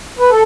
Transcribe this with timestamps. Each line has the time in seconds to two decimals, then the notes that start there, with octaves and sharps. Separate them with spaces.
0.19 B4
0.30 A4